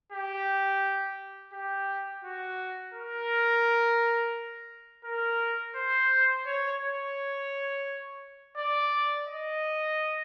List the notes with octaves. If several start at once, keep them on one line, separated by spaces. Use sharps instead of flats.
G4
G4
F#4
A#4
A#4
C5
C#5
C#5
D5
D#5